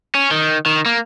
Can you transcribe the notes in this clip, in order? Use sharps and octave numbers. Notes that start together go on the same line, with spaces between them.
C#4
D#3
D#3
A#3